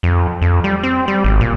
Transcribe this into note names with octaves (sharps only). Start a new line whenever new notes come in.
F2
F2
G3
C4
G3
G#1
A#2